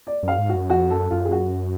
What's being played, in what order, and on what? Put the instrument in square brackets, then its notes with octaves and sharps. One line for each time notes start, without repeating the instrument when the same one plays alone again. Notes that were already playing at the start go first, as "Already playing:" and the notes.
[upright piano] D5
[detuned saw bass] F#2 [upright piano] F5
[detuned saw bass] G#2
[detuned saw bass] F#2 [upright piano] F#4
[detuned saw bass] F2 [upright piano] F#4
[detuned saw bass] F#2 [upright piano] A4
[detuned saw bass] F#2 [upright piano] F4
[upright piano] G#4
F#4